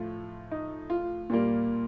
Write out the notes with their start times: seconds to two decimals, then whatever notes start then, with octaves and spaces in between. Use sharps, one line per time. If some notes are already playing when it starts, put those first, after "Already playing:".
Already playing: A2 F3 A3 F4
0.51 D#4
0.90 F4
1.30 A#2 G3 A#3